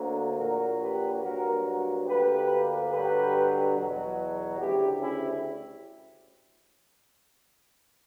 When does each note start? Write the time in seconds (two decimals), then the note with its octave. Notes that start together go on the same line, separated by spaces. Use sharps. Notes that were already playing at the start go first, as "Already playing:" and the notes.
Already playing: D2 D3 F#3 A#3
0.38 A#1 A#2 F#3 A#3 F#4 A#4
0.81 G4 B4
1.22 G2 F#3 A#3 F#4 A#4
2.07 D2 D3 A#3 G4 B4
2.91 G2 D3 F#3 G4 B4
3.76 E2 B2 F#3
4.60 D2 C#3 G3 E4 G4
5.01 C#4 E4